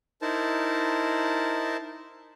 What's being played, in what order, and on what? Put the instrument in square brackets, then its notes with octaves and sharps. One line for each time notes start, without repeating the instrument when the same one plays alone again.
[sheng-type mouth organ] D#4 E4 A#4 C5 A5